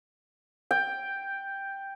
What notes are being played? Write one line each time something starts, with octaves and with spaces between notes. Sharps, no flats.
G5